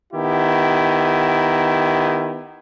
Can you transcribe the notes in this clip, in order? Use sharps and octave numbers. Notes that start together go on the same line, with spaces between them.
D#3 B3 E4 G4